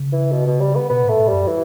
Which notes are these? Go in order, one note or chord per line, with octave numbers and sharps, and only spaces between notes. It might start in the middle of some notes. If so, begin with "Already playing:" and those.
Already playing: C#3
E3
B2
B2
G3
B3
B2 B3
A2 A3
A2
F#2 G3
E3